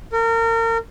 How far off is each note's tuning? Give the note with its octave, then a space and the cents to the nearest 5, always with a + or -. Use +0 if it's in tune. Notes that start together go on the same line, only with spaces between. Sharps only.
A#4 -35